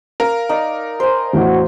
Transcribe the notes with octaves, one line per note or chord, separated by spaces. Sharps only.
A#4 F5
D#4 D5
C5 G#5
A1 E2 A2 F#4